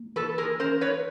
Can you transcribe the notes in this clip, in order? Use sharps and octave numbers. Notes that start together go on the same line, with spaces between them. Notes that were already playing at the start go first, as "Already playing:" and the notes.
Already playing: A#3
E3 A4 B4
G#4 A#4
C#4 A#4 C5
B4 C#5